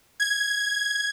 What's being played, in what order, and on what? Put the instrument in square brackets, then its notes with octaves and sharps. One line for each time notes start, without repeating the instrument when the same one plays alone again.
[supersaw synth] G#6